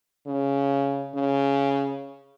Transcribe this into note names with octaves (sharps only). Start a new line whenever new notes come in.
C#3
C#3